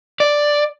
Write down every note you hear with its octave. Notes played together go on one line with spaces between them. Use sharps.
D5